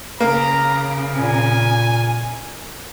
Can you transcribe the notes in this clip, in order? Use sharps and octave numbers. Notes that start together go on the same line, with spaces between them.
C#3 A#3 A#5
A#2 G#5